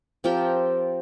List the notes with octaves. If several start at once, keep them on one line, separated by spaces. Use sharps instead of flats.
F3 C4 G4 A#4